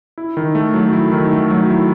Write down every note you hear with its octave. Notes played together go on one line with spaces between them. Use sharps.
E4
D#3
A3
F#3
E4
D#3
A3
F#3
E4